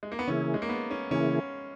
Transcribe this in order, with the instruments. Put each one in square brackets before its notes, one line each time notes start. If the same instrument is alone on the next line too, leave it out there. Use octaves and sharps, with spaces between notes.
[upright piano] G#3
A#3
B3
[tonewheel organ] C#3 E3 A#3 E4 G#4 [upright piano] C#4
[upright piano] G#3
A#3
B3
C#4
[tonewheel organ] C#3 E3 A#3 E4 G#4 [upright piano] C#4